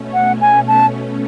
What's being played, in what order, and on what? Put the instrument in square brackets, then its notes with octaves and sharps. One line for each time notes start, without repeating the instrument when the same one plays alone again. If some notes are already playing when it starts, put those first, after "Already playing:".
Already playing: [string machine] B2 A3 C#4
[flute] F#5
G#5
A5